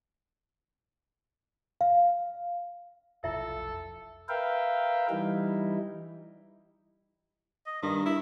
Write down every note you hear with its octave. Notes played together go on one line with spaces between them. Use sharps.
F5
F1 B1 F2 E4 F4 A4 E5
A#4 B4 E5 F5 G5
E3 G3 D#4 E4
D#5
G2 D#3
E4